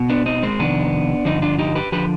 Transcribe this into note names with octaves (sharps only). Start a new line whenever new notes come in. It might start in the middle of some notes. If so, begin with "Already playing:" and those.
Already playing: B2
B3 D4
C4 D#4
G#3 C4
F2 C3 D#3 B3 D4
G2 D3 F3 C4 D#4
D4 F4
D#4 G4
G4 B4
D3 F3 G4 B4